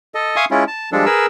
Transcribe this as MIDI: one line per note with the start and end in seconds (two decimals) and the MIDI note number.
0.15 0.36 69
0.15 0.36 75
0.36 0.45 76
0.36 0.45 77
0.36 0.45 80
0.36 0.45 84
0.36 0.45 85
0.36 0.45 87
0.51 0.64 56
0.51 0.64 61
0.51 0.64 64
0.51 0.64 65
0.68 0.90 81
0.92 1.05 53
0.92 1.05 55
0.92 1.05 56
0.92 1.05 62
0.92 1.05 69
1.06 1.26 68
1.06 1.26 70
1.06 1.26 71
1.06 1.26 88